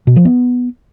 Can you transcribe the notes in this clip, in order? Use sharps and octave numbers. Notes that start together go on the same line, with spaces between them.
B2
F3
B3